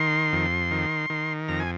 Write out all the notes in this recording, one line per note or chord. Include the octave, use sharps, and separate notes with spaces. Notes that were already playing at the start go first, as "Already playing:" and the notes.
Already playing: D#3 C6
F2
D#3
D#3
F2 A#5
G#5